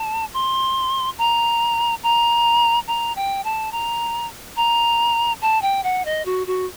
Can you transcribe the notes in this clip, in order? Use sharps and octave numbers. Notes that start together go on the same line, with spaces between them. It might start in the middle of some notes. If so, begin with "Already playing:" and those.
Already playing: A5
C6
A#5
A#5
A#5
G5
A5
A#5
A#5
A5
G5
F#5
D#5
F#4
F#4